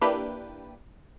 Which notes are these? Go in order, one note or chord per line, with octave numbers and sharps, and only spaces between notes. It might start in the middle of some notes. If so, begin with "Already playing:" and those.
A#3 D4 E4 G4 B4